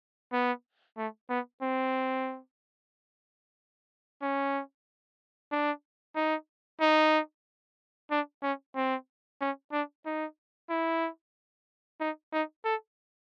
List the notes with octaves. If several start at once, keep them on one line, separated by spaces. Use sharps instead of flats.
B3
A3
B3
C4
C#4
D4
D#4
D#4
D4
C#4
C4
C#4
D4
D#4
E4
D#4
D#4
A4